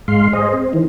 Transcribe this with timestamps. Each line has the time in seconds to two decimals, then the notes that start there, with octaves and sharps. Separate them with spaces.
0.08 G#2 G#3 F5 C6
0.33 G#4 C5 D#5
0.53 C4
0.73 D#3 E3